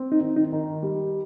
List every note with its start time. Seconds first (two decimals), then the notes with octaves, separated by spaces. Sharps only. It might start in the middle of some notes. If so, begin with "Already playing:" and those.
Already playing: C4
0.12 D#4
0.20 D#3
0.36 D#4
0.52 D#3
0.83 G3